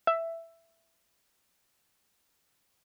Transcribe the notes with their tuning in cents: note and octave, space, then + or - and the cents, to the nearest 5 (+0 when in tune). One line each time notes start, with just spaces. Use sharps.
E5 +10